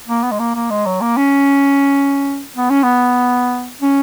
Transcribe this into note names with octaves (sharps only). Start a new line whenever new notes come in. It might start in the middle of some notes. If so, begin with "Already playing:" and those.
A#3
B3
G#3
A#3
A#3
G#3
F#3
A#3
C#4
B3
C#4
B3
C#4